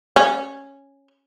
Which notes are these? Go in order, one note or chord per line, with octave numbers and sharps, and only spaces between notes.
C#4